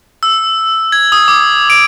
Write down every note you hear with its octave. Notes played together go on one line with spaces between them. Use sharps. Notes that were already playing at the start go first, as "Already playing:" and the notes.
E6
G#6
D#6
D6
D7